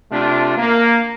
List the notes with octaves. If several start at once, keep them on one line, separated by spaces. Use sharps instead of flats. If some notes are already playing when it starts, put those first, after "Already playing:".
C3 A3 D4 F4
A#3